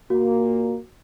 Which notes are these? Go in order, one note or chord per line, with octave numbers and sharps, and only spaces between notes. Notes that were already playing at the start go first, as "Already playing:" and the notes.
A#2 A#3 F#4